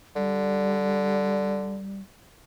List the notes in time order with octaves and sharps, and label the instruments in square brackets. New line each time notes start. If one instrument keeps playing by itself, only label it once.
[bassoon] D3 [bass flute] G3